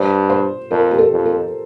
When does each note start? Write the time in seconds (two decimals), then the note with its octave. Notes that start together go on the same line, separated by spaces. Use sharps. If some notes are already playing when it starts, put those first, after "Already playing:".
Already playing: G2 C5
0.30 C5
0.71 F2 A#4
0.91 G4
0.98 A4
1.12 F2
1.26 A4